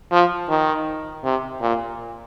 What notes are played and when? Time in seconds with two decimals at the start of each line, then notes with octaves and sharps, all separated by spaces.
0.12 F3
0.49 D#3
1.24 C3
1.61 A#2